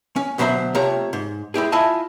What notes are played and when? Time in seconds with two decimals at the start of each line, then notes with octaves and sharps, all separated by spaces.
0.16 C#4
0.38 D2 B2 F#3 C5 E5 A#5
0.75 C3 A3 F4 C#5 A#5
1.13 G#2
1.54 G#3 E4 G4 G#4
1.72 E4 F4 D#5 E5 G#5 A5